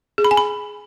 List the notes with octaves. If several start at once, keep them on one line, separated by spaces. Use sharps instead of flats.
G#4
B5
G#5
B5